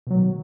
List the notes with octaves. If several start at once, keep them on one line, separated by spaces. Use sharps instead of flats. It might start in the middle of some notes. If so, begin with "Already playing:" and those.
B2 D#3 F#3